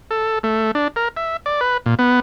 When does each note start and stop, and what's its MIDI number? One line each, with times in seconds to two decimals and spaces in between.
0.11 0.39 69
0.43 0.71 57
0.75 0.88 62
0.96 1.08 70
1.17 1.37 76
1.46 1.60 74
1.61 1.77 71
1.86 1.95 46
1.99 2.20 59